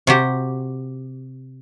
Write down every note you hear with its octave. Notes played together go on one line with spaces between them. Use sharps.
C3 F#4 G4